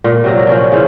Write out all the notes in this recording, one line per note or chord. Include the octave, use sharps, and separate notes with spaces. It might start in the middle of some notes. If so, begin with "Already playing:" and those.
A#2
C3 F#3 A#3
F3 C#4 D4
C#3 E3 F3